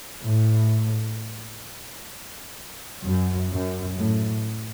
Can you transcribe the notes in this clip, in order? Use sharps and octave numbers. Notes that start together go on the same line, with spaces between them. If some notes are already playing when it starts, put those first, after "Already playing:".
A2
F#2
F#2
A2